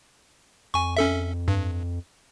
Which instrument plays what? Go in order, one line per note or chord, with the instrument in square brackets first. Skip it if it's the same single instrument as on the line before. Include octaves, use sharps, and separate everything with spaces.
[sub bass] F2 [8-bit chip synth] G#5 C#6
[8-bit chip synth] C#4 A4 E5
G2